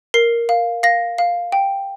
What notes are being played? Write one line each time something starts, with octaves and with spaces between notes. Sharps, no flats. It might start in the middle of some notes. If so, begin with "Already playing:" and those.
A#4 C7
F5
F5 A#6
F5
G5